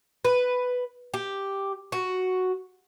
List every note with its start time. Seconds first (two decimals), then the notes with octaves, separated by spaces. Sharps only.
0.25 B4
1.14 G4
1.92 F#4